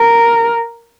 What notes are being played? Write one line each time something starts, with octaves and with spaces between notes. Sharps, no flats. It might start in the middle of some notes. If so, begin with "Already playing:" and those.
Already playing: A#4